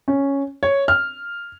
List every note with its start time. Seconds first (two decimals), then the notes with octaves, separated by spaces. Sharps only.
0.08 C#4
0.63 C#5
0.88 F6